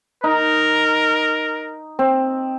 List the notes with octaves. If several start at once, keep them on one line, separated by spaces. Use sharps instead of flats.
D#4 A#4
C4